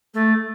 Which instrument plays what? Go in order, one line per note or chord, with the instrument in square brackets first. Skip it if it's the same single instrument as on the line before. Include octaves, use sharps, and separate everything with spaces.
[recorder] A3